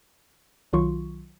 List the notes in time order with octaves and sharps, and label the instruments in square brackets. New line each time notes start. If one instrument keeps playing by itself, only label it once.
[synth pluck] B1 D#3 F#3 F4 C6 C#6